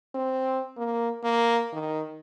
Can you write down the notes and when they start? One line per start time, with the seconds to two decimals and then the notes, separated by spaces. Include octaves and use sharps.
0.15 C4
0.77 A#3
1.23 A#3
1.73 D#3